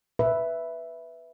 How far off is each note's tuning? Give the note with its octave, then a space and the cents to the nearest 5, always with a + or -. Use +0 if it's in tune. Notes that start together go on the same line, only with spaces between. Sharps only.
B4 +0 E5 +0